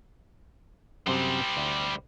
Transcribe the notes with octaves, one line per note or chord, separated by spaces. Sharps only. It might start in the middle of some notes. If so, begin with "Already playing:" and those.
F#2 C3 G3 C5
D2